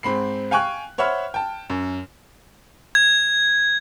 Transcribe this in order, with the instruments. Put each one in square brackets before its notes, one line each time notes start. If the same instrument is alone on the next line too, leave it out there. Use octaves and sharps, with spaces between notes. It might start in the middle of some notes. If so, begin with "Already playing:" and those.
[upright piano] G#2 C4 B5 C7
F5 G5 G#5 C#6 F#6
C5 C#5 E5 F#5 B5 F6
G5 A5
F#2
[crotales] G#6